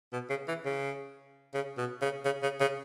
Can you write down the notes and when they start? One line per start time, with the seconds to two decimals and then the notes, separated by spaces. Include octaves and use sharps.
0.13 B2
0.30 C#3
0.48 E3
0.66 C#3
1.54 C#3
1.78 B2
2.02 C#3
2.25 C#3
2.43 C#3
2.61 C#3